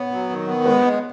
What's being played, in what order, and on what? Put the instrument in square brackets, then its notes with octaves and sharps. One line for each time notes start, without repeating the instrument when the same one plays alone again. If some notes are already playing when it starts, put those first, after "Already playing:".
Already playing: [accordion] B3 [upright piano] C#5
[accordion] F#3
D#3
B3
[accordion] G#3 [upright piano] B4
[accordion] G#3